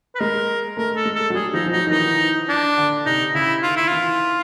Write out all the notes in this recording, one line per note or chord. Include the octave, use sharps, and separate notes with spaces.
B4
G#3 A#4
A3 A#4
A4
G#3
A4
F#3
G3 G#4
F3 D#4
F3
F#3 D#4
D#3
E3 D#4
D4
D3
C3 D#4
C#3 E4
D#3 F4
E4
E3 F4